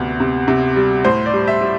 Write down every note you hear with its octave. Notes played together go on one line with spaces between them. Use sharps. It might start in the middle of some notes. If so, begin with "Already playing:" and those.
Already playing: D2 C3 B3
C3
C3
G3
A2 C5
D5
G3
E5
G3